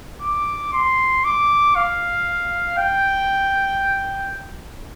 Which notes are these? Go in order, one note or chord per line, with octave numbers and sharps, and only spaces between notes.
D6
C6
D6
F5
G5